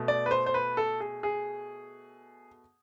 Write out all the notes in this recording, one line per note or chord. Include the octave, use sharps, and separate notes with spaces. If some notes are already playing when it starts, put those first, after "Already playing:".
Already playing: B2 A3
D5
B4
C5
C5
B4
A4
G#4
G#4